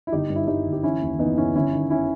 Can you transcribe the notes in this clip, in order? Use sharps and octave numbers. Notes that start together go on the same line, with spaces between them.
E4
G1 D#4 G4
G2
E4
G2 D#4 G4
G1
G4
E3 C#4 E4
D#2
E3 B3 D#4
C#3 C#4 E4
G1 C#4 E4
D#3
C#4 E4